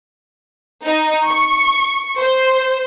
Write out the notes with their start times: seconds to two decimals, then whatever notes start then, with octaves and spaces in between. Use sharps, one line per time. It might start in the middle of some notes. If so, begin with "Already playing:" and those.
0.86 D#4
1.29 C#6
2.20 C5